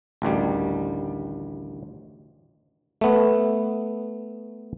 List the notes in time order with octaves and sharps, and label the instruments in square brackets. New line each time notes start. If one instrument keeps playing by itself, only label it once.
[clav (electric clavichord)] A1 D2 D#3 G3
A3 B3